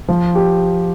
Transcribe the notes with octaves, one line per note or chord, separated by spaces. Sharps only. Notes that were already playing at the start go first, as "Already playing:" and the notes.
F3
G4